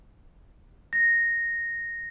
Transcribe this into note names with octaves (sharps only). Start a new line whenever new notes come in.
A#6